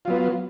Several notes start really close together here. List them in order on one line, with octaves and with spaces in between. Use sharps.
F4 F#3 B3